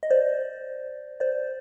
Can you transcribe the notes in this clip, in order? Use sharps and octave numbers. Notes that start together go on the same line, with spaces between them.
D#5
C5 D5
C5 D5